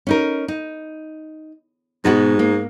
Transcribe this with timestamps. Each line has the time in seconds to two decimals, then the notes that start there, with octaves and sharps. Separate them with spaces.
0.07 C#4 D#4 A#4
0.48 D#4
2.05 G#2 B2 B3 F#4
2.39 A#3